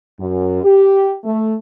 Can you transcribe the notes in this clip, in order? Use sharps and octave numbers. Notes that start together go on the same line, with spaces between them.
F#2
G4
A3